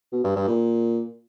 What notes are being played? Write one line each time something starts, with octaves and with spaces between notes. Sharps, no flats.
B2
G2
G2
A#2